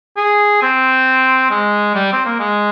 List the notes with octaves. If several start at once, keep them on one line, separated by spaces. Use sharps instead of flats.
G#4
C4
G#3
G3
C4
A#3
G#3